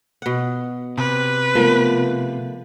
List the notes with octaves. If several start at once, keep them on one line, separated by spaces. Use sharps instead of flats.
B2 F#5
C3 B4
F3 A3 B3 A#4